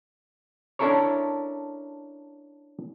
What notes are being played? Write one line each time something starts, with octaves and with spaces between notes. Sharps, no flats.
C#4 D4 E4 A4 A#4 C#5